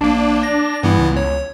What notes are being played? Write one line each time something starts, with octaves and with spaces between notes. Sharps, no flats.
A#1 A#3 D4
A#6
G2 E3 B3 E4
C#2
C#5